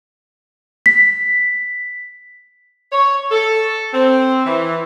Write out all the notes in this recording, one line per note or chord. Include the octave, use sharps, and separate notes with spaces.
B6
C#5
A4
C4
E3